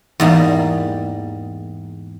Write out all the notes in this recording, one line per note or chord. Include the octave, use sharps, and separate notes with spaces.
E2 G#2 G3 A#3